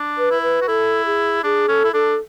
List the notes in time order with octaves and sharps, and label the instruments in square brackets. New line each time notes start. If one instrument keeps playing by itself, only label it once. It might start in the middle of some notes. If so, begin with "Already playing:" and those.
Already playing: [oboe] D4
[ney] B4
[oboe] E4
[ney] B4
[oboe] F#4
[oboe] E4 [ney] A4
[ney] G#4
[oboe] D4 [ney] G#4
[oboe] C#4 [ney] A4
[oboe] E4
[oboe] D4 [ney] A4